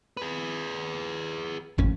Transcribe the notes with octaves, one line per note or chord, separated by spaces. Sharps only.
G#4 B4
G#1 F2 A2 C#4